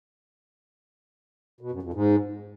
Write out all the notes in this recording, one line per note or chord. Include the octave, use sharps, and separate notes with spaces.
B2
F#2
F2
G#2